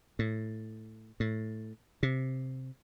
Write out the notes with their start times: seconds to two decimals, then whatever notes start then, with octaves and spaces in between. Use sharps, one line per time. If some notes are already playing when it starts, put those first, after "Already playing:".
0.19 A2
1.20 A2
2.03 C3